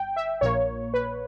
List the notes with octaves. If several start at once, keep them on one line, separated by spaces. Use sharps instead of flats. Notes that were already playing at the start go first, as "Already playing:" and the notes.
Already playing: G1 G5
E5
A#1 A#2 A#3 C#5
B4